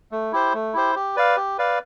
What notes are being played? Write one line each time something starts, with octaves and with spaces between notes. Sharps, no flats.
A3
E4 G4 C5
A3
E4 G4 C5
G4
B4 D5 F5
G4
B4 D5 F5